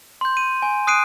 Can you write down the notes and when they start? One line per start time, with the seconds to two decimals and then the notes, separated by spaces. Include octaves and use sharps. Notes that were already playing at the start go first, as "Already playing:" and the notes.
0.21 C6 G6
0.37 D#7
0.62 G#5
0.87 D#6 F#6 C7 D7 D#7